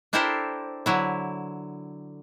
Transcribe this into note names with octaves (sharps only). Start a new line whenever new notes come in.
D4 E4 G4 A4 A#4 C5
D3 F#3 E4